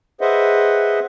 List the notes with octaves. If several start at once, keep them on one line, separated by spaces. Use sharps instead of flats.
G#4 B4 C5 D#5 E5 F#5